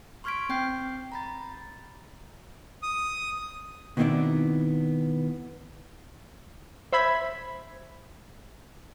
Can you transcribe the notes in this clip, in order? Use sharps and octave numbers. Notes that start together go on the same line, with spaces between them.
C6 C#6 F6 G#6 B6 D7
C4 G5 G6 C7
A#5 B5 A6
D#6
B2 D#3 B3 C4 E4 D5
C5 E5 B5 G#6 B6